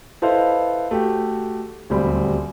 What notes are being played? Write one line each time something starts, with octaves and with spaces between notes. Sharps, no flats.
E4 A4 B4 C5 D#5 F5
A3 F#4 G4
D#1 D2 F#3 G3 C4 B5